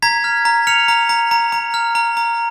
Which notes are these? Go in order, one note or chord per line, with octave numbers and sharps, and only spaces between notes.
A#5 G#6 B6
F6
A#5
F6 C#7 F7
A#5
A#5
A#5
A#5
F6
A#5
A#5